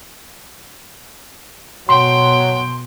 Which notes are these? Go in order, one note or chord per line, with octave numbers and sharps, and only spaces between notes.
B2 F#3 G5 C6